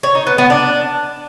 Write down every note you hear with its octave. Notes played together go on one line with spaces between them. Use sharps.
C#5
D#4
B3
B3
D4